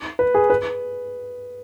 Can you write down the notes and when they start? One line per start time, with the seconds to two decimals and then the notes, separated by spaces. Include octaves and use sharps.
0.19 B4
0.34 G#4
0.50 B4